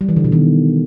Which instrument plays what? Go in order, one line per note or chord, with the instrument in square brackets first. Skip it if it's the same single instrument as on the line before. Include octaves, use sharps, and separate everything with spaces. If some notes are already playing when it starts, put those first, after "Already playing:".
[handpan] G3
E3
D3
B2
D#3